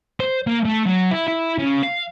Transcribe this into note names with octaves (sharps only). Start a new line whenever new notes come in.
C5
A#3
A3
F#3
E4
E4
C#3
F5